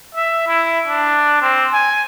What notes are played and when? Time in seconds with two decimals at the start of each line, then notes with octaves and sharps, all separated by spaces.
0.15 E5
0.47 E4
0.88 D4
1.42 C4
1.73 G#5